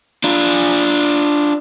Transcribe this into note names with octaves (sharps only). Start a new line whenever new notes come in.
D4 F4